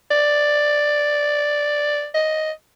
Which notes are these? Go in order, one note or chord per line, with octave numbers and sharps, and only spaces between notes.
D5
D#5